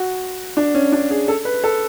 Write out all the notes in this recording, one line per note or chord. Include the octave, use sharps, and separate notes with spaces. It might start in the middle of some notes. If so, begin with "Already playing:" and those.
Already playing: F#4
D4
C#4
D4
G#4
A4
B4
A4